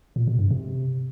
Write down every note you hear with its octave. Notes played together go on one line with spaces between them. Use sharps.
A#2
B2
G2
C3